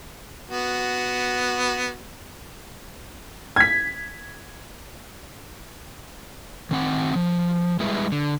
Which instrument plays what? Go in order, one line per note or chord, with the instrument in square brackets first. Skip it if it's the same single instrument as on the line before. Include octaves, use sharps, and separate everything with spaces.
[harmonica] B3 F#4
[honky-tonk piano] G#6 B6
[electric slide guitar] D#3 C4 F#5
F3
G3 G#3 E4 G#4 B4 E5
D3